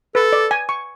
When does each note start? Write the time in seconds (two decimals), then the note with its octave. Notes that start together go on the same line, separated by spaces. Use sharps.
0.15 A4 B4
0.33 D5
0.51 G#5
0.69 C#6